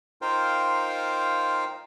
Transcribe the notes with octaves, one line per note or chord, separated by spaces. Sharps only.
D#4 F4 A#4 C5 F5 G5